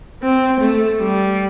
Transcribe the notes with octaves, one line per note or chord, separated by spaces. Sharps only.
C4
A3
G3